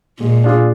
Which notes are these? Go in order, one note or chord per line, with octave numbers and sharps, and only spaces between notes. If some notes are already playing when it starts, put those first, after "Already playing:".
A#2 G#3
D4 F4 G#4